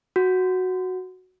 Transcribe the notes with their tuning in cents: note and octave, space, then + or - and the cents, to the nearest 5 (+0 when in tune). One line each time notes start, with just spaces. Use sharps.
F#4 +0